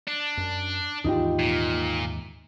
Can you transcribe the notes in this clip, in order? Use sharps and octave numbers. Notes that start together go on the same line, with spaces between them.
D4
F#2
D#2 G#2 E3 D#4 F4 G4
A#2